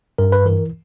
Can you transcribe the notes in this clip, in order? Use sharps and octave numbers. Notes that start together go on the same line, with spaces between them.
G2 A#4
B4
E3 A#4